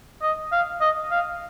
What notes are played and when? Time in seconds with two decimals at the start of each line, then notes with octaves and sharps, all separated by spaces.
0.22 D#5
0.52 F5
0.81 D#5
1.11 F5